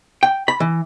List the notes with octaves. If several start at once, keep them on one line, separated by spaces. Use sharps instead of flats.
G5
B5
E3